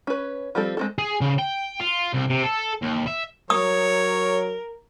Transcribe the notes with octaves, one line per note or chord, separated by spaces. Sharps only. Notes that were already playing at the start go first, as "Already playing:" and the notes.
C#4 B4
F3 G3 C4 A4
G#3 C4 A4
G#4
C#3
G5
F4
C2
C3
A4
D#2
E5
F#3 A#4 C#5 D#6